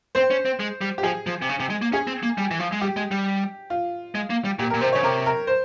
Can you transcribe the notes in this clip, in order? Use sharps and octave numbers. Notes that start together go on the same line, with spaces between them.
C4 C5
C#4
C4
G#3
G3
G4
F3 G#4
F3
C3
C#3
C3
G#3
A#3
C#4 G#4
C4
A#3
G3
E3
F3
G#3
G3 G4
G#3
G3
F4
G#3
A#3
G3
A#2 G4
A#4
A#2
C3 C5
C#3 C#5
C3 A#4
A#4
C5